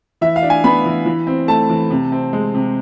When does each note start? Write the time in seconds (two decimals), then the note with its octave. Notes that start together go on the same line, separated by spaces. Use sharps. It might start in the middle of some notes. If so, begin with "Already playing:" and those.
0.21 E3 E5
0.36 F5
0.43 D4
0.50 G#5
0.64 B3 B5
0.85 E3
1.06 E3
1.27 C4
1.48 A3 A5
1.69 E3
1.91 C3
2.12 C4
2.33 G#3
2.55 C3